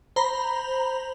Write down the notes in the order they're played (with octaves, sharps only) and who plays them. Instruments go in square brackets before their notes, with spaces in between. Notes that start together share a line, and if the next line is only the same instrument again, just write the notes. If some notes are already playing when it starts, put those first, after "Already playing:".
[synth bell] C5 A#5 B5